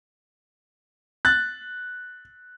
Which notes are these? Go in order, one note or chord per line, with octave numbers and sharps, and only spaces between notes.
F#6 A6